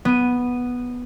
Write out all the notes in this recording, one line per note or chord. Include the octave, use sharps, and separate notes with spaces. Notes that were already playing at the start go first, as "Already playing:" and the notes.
B3 D#7